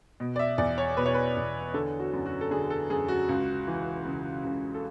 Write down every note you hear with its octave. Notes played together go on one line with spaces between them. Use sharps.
B2
D5
E5
E2 D5
C#5
B2 B4
C#5
B4
E2
D3 A4
F#4
F#2
F#4
A4
D3 G#4
A4
F#2 G#4
F#4
C#2
E3
C#3
C#2
A4